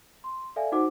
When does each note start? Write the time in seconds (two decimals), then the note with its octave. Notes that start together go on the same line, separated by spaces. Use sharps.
0.24 C6
0.56 A4 D5 E5 F5 G#5
0.72 D#4 F#4 C5 F#5 D6